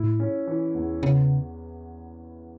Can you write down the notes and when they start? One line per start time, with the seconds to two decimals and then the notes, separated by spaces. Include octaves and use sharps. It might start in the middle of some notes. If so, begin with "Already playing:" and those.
Already playing: A2 E4
0.20 C#4
0.47 E3
0.74 E2
1.03 C#3 B3